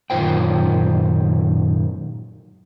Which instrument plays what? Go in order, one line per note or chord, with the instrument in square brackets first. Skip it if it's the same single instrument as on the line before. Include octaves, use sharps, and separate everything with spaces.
[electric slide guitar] F#2 A#2 D#3 F4 C5 G5